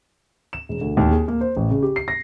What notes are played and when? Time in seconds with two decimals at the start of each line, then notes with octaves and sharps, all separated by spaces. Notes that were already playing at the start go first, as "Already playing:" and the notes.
0.53 E7
0.69 E1
0.81 D2
0.97 D#2
1.11 G#4
1.28 A#3
1.41 C5
1.57 A1
1.71 C#3
1.83 G4
1.96 C7
2.08 A#6